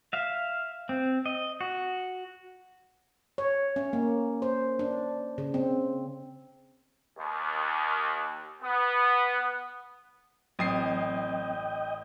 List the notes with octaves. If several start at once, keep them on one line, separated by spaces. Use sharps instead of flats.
E5 F5
C4
D#5
F#4
C#5
C#4
A#3
C5
D4
C#3
C4
D#2
B3
A1 F#3 C4 D#5 G5 D#6 C7